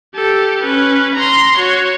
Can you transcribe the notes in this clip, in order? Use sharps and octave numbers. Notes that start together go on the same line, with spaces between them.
G4 A4
C#4 B4
A#5 C6
F#4 C#5